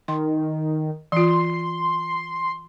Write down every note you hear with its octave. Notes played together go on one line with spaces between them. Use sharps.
D#3 C6
E3 F4 C6